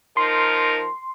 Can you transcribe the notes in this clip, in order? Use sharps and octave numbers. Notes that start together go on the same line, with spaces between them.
F3 D#4 A#4 C6